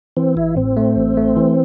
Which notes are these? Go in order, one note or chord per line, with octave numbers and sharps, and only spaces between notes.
E3 C4
A1 E4
A2 C4
A3
A1
A3
E3